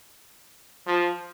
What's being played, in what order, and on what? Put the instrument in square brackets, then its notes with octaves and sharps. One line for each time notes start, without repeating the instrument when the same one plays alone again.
[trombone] F3